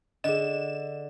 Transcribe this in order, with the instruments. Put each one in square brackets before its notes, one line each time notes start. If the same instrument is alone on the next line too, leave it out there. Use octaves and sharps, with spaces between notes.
[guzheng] D3 [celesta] G#4 D#5 [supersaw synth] E7